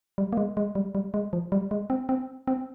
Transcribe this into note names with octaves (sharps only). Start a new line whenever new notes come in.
G3
A#3
G#3
G#3
G3
G3
G#3
F3
G3
G#3
C4
C4
C4